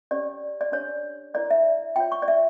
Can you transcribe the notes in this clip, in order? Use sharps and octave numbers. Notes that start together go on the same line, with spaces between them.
C#4 G4 C#5 D5
D5
D4 G4 C#5
E4 A#4 C#5 D5
E5
F4 C#5 G5
C#6
D5
E5